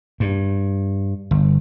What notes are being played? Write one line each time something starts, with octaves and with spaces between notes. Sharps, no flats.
G2
G1